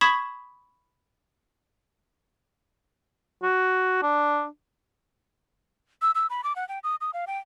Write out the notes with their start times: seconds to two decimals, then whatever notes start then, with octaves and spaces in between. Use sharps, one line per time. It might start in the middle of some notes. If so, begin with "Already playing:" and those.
0.01 B5 C#6 D#6 G#6 B6 E7
3.43 F#4
4.03 D4
6.02 E6
6.15 E6
6.30 B5
6.44 D6
6.56 F#5
6.69 G5
6.84 D#6
7.01 D#6
7.14 F5
7.27 G5